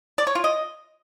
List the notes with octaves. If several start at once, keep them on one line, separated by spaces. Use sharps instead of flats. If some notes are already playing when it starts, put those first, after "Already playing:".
D5
C#5
F4
D#5